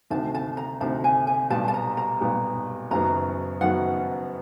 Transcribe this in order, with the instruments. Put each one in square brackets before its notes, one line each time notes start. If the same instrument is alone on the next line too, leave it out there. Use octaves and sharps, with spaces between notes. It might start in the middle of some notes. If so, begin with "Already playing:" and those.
[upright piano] D2 C3 D#3 [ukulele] A5
[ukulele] A5
A#5
[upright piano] D2 C3 D#3 [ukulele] A5
[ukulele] G#5
G#5
[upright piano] B1 A#2 G3 B3 [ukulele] A5
[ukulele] A5
A#5
A#5
[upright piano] B1 A#2 G3 B3
[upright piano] F#1 F#2 D#3 F#3 B3 [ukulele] A#5
[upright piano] F#1 F#2 D#3 F#3 B3 [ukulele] F#5